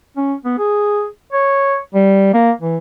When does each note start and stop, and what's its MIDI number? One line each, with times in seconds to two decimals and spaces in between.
0.17 0.34 61
0.45 0.55 59
0.58 1.06 68
1.33 1.78 73
1.94 2.34 55
2.34 2.51 58
2.61 2.78 52